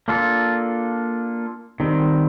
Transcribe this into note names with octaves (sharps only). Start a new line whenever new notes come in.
A#3 D4 F4 A4
D#3 G3 C4